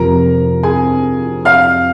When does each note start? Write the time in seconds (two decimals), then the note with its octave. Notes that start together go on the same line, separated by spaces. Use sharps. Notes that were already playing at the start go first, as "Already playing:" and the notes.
Already playing: F2 C3 F3 A#4 A#5
0.63 G#4 G#5
1.45 F5 F6